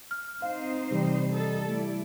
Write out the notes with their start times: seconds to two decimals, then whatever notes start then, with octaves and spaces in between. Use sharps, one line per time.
0.11 F6
0.42 C4 D#4 C5 F5
0.91 C3 E3 G3
1.31 D#4 A4
1.68 A3 E4 D5